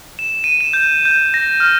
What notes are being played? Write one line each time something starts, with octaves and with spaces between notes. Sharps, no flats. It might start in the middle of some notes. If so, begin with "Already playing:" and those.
E7
D#7
E7
G6
G6
A#6
F6